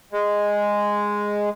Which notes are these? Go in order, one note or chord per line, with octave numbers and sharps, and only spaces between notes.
G#3